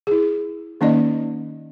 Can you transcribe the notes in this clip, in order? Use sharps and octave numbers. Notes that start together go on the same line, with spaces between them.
E4 G#4
D#3 A#3 C#4 D#4 D5 D#5